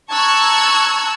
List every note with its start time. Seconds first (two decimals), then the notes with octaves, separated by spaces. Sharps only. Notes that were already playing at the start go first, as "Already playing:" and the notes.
0.12 A5 A#5 C#6 E6 F#6 G#6